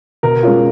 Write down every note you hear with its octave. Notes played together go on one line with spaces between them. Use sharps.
B2 A#4
G#3 C#4 F4